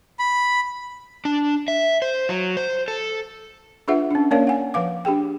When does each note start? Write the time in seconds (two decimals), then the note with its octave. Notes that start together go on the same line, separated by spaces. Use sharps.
0.19 B5
1.25 D4
1.68 E5
2.02 C5
2.29 F#3
2.57 C5
2.88 A4
3.88 D4 F4 G#4 B4 E5 F#5
4.11 C#4 D4
4.31 A#3 C#4 A#4 C#5 D5 F5
4.47 F#5 G#5
4.74 F3 B4 F5 D6
5.05 D4 G4 G#4 G5